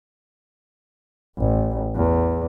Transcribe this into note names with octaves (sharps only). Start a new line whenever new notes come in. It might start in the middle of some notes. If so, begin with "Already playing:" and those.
A1
E2